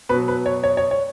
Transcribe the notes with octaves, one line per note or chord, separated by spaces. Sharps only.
B2 F#3 B4
B4
C#5
C#5
C#5
C#5